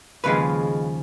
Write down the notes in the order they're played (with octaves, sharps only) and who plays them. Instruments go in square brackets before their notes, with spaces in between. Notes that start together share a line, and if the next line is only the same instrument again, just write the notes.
[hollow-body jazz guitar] D#2 C#3 F3 G#3 B4